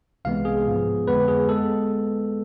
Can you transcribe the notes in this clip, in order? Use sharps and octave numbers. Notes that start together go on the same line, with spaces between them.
C2 C3 E3 G#3 B3 F5
G#4
A1 G#2 F3 B3
F2 D3 G#3 B3 B4
G#4
G#3 B3 A4